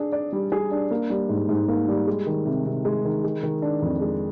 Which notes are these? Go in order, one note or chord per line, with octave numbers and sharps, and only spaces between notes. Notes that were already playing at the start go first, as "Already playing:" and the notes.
Already playing: D4 G#4
D5
G3
G#4
D4
A#3
G3
G#2
G#2
A#3
G3
G#3
D#3
C3
C3
G#3
D#3
G#3
D#3
D4
F2
G#3